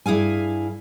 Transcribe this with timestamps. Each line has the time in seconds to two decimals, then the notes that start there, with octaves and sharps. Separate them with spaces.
0.06 G2 E4 G#4 F5 G#5